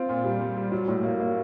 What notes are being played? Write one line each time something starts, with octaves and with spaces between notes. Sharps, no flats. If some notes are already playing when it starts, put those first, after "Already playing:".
Already playing: C4 F4
A#2
G3
G3
G3
F#3
A2
A#3
A#3